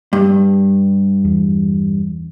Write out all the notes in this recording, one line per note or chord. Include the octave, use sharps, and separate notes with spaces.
G2
E2